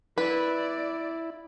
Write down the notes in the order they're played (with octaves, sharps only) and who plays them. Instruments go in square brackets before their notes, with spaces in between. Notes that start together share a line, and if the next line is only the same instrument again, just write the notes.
[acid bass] E4 [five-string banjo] B4 [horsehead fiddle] D5